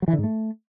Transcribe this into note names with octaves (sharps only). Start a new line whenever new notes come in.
F#3
E3
D3
G#2
A3